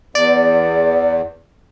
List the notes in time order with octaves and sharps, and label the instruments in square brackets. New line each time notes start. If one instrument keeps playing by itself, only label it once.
[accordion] E2 [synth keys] D5